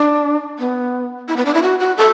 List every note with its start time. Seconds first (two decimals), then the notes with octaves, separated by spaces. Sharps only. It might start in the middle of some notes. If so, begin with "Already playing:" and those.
Already playing: D4
0.59 B3
1.28 E4
1.37 B3
1.45 D4
1.54 E4
1.62 F#4
1.80 F#4
1.98 A4